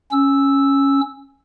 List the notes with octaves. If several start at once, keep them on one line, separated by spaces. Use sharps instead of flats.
C#4 E6